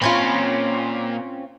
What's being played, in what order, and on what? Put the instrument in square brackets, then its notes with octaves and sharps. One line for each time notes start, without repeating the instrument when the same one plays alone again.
[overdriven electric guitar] A#2 B5 [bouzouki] C4 C#4 F4